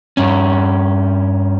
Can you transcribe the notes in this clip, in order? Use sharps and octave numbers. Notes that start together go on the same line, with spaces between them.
G2 C#4